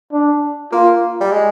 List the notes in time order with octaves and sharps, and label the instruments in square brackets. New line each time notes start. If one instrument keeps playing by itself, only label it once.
[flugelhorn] D4
[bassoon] A#3 [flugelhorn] F4
[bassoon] G3
G#3